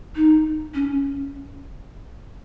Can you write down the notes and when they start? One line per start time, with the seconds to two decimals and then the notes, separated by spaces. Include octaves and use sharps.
0.16 D#4
0.74 C#4